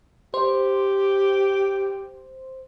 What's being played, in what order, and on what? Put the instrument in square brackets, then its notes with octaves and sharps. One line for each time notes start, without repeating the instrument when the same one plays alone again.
[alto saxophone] G4 [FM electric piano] C5